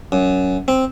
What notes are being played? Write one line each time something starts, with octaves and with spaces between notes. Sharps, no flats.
F#2
C4